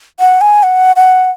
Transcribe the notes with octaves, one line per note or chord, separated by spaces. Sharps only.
F#5
G#5
F#5
F#5